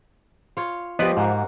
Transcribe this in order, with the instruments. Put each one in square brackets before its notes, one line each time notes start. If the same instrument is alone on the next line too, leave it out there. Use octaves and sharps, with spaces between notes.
[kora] F4 C#5
[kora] F3 [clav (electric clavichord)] B3 B4 D5 [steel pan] G4 D#5
[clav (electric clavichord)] G#2 [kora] A#3 F#4